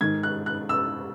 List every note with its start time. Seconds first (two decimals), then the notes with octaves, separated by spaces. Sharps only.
0.01 G#2 D#3 G#6
0.23 F#6
0.46 F#6
0.69 E6